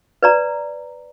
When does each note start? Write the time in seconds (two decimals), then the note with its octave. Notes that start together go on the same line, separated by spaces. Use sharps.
0.23 B4 D5 A#5